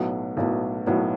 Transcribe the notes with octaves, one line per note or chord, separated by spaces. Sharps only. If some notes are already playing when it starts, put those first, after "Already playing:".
Already playing: B1 A2 F#3 B3
B1 A2 F#3 B3
B1 A2 F#3 B3